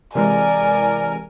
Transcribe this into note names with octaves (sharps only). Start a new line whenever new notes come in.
C3 E3 G#3 A#4 D5 G#5